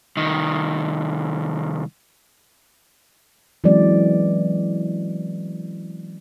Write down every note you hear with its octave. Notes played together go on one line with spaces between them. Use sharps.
C2 D#3
E3 F#3 G#3 C4 C#4 D5